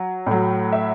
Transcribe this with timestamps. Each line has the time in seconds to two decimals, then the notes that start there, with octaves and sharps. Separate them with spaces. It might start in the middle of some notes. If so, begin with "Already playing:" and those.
Already playing: F#3
0.26 A2 F#3
0.73 E5